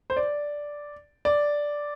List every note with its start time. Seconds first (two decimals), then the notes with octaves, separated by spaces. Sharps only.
0.10 C5
0.17 D5
1.25 D5